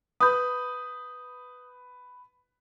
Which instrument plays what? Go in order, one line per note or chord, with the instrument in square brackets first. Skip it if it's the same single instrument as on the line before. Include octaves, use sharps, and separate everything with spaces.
[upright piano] B4 B5 [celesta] D#6 G6